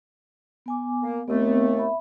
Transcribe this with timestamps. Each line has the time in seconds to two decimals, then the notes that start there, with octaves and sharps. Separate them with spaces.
0.66 B3 G#5 D6
1.03 A#3
1.28 D#2 A3 B3 C4
1.77 E5 B5